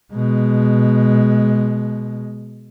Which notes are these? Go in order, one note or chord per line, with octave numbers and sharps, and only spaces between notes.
B2 G#3